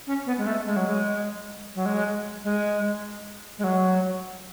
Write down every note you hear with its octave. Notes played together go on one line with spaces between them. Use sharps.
C#4
B3
G#3
A3
G#3
F#3
G#3
F#3
G#3
G#3
G#3
F#3